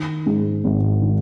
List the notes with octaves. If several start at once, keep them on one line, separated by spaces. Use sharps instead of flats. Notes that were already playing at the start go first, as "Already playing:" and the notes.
Already playing: D#3
G#2
G#1
D#3